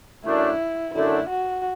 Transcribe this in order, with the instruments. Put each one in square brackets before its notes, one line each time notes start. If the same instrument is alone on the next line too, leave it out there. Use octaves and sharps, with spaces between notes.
[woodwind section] F#2 D3 A3 D4 [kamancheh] E4
[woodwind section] F#2 D3 A3 D4 [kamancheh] E4
[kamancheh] F#4